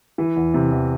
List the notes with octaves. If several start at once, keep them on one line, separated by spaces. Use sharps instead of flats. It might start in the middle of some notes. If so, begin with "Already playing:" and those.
E3
E2
C3
E2